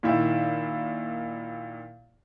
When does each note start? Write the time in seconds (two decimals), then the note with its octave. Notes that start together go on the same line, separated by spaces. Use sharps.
0.03 A#2 D#3 E4 E5